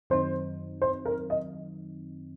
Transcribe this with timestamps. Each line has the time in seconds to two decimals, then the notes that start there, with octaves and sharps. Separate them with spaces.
0.10 F#2 D#3 F#3 C4 D#4 C5
0.82 C5
1.06 A#4
1.30 D#5